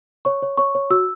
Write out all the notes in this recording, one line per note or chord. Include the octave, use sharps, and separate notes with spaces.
C#5 C#6
C#5
C#5 C#6
C#5
F#4 E6